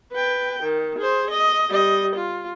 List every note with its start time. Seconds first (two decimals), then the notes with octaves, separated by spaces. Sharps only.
0.13 B4 G5
0.63 D#3
0.98 G#4 C5
1.31 D#5
1.69 G3 D#5
2.16 F4